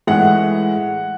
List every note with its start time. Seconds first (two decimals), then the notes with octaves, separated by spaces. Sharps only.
0.07 A2 E3 G#3 F#5